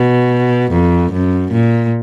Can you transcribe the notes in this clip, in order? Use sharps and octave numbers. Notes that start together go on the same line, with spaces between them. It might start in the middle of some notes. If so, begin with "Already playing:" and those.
Already playing: B2
F2
F#2
A#2